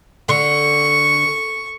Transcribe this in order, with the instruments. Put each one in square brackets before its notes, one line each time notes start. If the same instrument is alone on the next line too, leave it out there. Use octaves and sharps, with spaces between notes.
[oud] D3 [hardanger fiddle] C#6